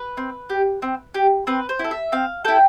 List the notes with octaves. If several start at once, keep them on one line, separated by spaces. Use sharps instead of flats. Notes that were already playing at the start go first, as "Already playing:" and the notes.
Already playing: B4
C4
G4
C4
G4
C4 B4
C5
E4 A4
E5
C4 F5
E4 A4 G5